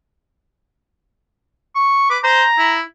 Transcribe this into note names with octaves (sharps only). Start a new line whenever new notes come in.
C#6
B4 D6
C5 A#5
E4